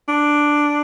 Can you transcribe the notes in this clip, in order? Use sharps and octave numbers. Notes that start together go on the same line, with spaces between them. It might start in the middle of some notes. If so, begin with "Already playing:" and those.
D4